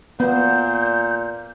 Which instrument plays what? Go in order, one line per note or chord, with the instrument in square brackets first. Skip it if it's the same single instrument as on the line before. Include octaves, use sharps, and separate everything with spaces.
[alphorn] A#2 [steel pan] B3 [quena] G6